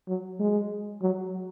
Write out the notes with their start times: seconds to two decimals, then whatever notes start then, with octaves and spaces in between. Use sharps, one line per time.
0.09 F#3
0.40 G#3
1.02 F#3